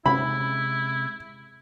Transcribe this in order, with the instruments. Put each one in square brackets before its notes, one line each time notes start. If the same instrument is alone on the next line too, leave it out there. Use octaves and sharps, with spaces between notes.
[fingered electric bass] C3 G#3 C#4 [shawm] E4 [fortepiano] B5